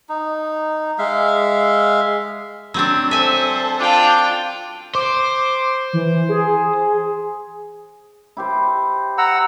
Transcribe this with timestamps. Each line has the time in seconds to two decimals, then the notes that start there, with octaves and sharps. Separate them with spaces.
0.09 D#4
0.99 G#3 E5 F5
2.74 F#3 C4 D4
3.11 A4 C5 E5 G#5
3.80 D4 F4 G5
4.95 C5 D6
5.93 E3
6.29 G#4
8.37 E4 G4 C5
9.18 F#5 A#5 E6